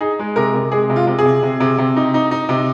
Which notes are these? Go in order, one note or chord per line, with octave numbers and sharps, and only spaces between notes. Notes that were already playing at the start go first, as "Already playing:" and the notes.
D#4 G#4
G#3
C3 A#4
C3
G#3 G#4
C3
F4
C3
G#4
C3
C3
C3
C3
D#4
D#4
D#4
C3